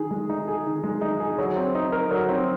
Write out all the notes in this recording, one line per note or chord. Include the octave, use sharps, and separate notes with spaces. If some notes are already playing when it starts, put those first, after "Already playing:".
Already playing: D#3 G#4
G#3
D#4
G#4
D#3
G#3
D#4
G#4
F#3
C4
D#4
A#4
F#3
C4